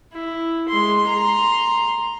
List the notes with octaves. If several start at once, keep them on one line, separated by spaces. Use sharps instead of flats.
E4
G#3 C6
A#5 C6